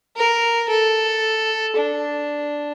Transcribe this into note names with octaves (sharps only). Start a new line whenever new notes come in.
A#4
A4
D4